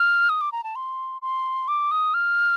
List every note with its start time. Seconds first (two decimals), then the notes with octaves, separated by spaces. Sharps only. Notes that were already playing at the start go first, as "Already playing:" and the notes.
Already playing: F6
0.29 D#6
0.41 D6
0.52 A#5
0.64 A5
0.76 C6
1.22 C6
1.68 D6
1.91 D#6
2.14 F6